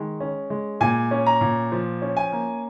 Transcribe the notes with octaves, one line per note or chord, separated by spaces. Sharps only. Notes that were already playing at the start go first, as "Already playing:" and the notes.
Already playing: D#3 G#3
C#4
G#3
A#2 G#5
C#4
A#5
A#2
F3
C#4
G#5
A#3